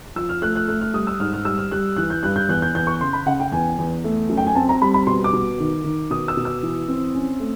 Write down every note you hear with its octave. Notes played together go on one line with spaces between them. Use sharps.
F3 E6
F6
A3 F#6
F#6
A3 F#6
F6
G3 D#6
E6
G#2 F6
F6
G3 E6
F6
G3 F#6
E3 F#6
G6
G2 F#6
G6
E2 F#6
G6
E2 G6
C#6
C#3 C6
B5
C#3 F#5
G5
E2 G#5
E2
A3
F#2
G5
G#5
C4 A5
A#5
G3 B5
B5
B2 C6
D6
B2
D#3
D#3
B2 D#6
E6
B2
E6
E3
C4
C#4
A3